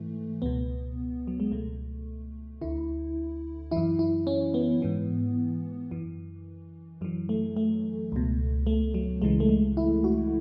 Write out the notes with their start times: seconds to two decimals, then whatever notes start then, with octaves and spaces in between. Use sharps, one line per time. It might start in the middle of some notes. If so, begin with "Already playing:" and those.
Already playing: G#2 E3 A3
0.42 C#2 B2 B3
1.27 F#3
1.40 G#3
1.52 C#2 B2 A3
2.61 D2 D3 E4
3.71 F#2 E3 E4
3.99 E4
4.27 C#4
4.54 B3
4.82 G#2 E3
5.91 F#2 E3
7.01 F#2 E3 F#3
7.29 A3
7.57 A3
8.12 C#2 B2
8.67 A3
8.94 F#3
9.22 C#2 C#3 E3 G#3
9.40 A3
9.49 G#3
9.77 E4
10.04 F#4